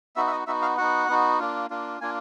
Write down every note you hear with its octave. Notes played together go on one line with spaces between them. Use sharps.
B3 D#4 F#4 E5
E5
D#5
B3 D#4 F#4 E5
F5
B3 D#4 F#4 F#5
B3 D#4 F#4
A#3 D4 F4
A#3 D4 F4
A#3 D4 F4 G#5